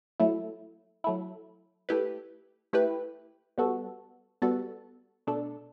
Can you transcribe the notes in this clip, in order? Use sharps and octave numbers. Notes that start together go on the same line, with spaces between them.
F#3 A3 E4
F#3 A3 E4
A3 E4 G4 B4
A3 E4 G4 B4
G3 B3 F#4 A4
G3 B3 F#4 A4
B2 A3 D4 A4